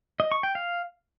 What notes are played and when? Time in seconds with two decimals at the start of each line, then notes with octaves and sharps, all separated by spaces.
0.20 D#5
0.32 C#6
0.43 G5
0.55 F5